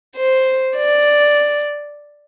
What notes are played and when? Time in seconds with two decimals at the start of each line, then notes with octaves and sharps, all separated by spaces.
0.16 C5
0.77 D5